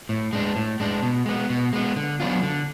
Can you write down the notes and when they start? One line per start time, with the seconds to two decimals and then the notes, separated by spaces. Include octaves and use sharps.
0.09 A2
0.33 G#3 D4
0.56 A2
0.80 G#3 D4
1.03 B2
1.26 G#3 B3
1.50 B2
1.73 G#3 B3
1.96 D3
2.20 F#3 B3 D4 F4
2.43 D3